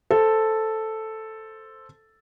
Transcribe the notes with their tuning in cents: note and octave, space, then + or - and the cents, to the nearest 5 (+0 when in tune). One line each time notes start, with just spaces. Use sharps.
A4 +0 C5 +0